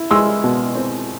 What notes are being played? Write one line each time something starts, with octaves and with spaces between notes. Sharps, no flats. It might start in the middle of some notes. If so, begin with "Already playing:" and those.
Already playing: E4
G#3 C6 E6
B2
C4